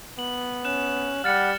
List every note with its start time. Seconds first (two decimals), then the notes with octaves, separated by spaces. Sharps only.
0.19 B3 F#7
0.65 C#4 F#6 E7
1.24 G3 F#5 F6 A6 C#7